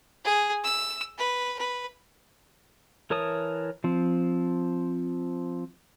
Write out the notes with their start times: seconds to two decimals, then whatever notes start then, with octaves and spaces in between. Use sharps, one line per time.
0.25 G#4
0.64 E6
1.18 B4
1.59 B4
3.10 E3 A#4 C#5 A5 D#6
3.84 F3 C4